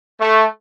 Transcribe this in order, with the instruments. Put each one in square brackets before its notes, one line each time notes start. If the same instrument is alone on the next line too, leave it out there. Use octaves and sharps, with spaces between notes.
[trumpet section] A3